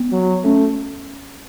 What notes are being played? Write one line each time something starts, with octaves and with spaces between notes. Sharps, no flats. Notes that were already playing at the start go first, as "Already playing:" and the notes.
Already playing: B3
F#3
A3 C#4